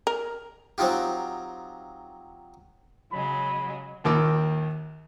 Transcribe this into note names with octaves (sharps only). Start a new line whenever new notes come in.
A#4
F#3 C4 D#4 F4 G4
C#3 F#3 G#3 B5
A#1 D#2 D#3 D6 E6